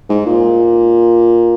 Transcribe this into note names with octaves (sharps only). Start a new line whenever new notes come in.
G#2
A#2